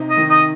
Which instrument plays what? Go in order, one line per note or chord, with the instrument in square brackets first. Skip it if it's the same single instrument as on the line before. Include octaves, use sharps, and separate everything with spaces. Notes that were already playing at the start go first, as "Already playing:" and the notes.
Already playing: [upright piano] C3 D#4
[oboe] D#5
[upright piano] D#3
[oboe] D#5